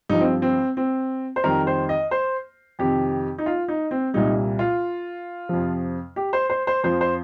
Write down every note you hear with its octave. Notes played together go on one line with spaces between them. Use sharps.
G2 F3 D#4
C4
C4
C4
C5
F2 D#3 G3 A#4
C5
D#5
C5
F2 C3 D#3 G4
D#4
F4
D#4
C4
C2 A#2 G3 D#4
F4
F2 C3 F3
G4
C5
C5
C5
F2 F3 C5
C5